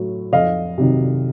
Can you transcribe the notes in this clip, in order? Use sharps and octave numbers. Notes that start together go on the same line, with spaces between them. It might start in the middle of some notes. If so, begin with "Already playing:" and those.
Already playing: A2 F#3
F2 D#5 F5
C3 D#3 F#3